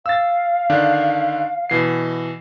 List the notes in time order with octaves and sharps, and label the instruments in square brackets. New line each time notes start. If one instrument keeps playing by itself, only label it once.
[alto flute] F5 [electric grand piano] E6 A6
[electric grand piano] D3 D#3 D4
B2 E3 C7